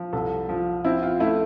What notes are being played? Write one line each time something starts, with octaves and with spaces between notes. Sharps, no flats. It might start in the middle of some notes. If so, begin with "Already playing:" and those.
Already playing: F3
C2 A4
F3
C4 E4
F4
A3 E4